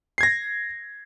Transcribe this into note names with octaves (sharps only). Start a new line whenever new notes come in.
G#6 A#6 C7